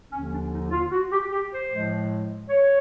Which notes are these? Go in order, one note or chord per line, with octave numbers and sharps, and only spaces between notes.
D#2 D3 F3 C#4
D4
D#4
F4
F#4
G4
G4
C5
A2 F3 G#3
C#5